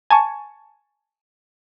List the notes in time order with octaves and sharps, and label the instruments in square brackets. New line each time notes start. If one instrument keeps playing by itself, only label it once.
[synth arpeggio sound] G#5 A5 C#6